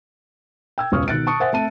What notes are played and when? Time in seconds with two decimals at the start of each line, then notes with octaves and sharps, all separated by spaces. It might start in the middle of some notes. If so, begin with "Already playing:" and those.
0.78 G5 E6 G#6
0.92 E1 C#2 C#3 C#6 D#6 F6
1.08 B2 D#3 F#6 A6 C#7 D7
1.27 A5 C#6 D#6 C#7
1.40 C5 E5 F#5 G#5 D#6 A6
1.53 A3 C4 A5 D#7